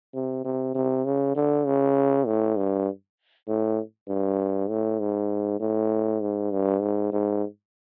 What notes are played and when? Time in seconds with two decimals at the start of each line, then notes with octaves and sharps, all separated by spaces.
0.14 C3
0.44 C3
0.75 C3
1.05 C#3
1.35 D3
1.66 C#3
2.26 A2
2.57 G2
3.48 A2
4.08 G2
4.69 A2
5.00 G#2
5.60 A2
6.21 G#2
6.51 G2
6.81 G#2
7.13 G#2